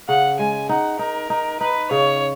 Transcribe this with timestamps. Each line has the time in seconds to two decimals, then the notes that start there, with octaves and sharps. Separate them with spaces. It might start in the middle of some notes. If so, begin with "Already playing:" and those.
0.08 C#3 F#5
0.39 G#3 G#5
0.69 D#4 F#5
0.99 D#4 A#4
1.30 D#4
1.60 D#4 B4
1.91 C#3 C#5